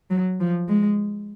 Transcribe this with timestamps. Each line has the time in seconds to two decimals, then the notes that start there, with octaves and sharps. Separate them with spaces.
0.10 F#3
0.40 F3
0.68 G#3